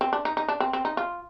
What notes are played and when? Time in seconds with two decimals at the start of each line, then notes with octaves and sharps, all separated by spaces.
0.01 C4
0.13 D4
0.25 D#4
0.37 D#4
0.48 D4
0.60 C4
0.73 C4
0.85 D#4
0.97 F4